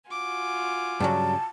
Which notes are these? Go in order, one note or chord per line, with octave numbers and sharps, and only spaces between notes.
F4 F#4 G#5 D6
G2 C#3 F#3 A5